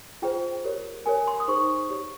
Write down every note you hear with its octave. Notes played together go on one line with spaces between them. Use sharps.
F4 G#4 C5 G5
G4 A#4 C#5
G4 A#4 C#5 G#5
C6
D#6
D#4 G#4 C5 C#6
G4 C#5